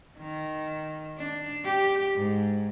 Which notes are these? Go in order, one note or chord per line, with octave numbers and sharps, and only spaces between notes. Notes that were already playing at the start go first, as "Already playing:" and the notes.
D#3
D4
G4
G#2